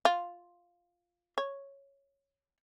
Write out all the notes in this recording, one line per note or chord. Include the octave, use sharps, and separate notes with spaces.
F4
C#5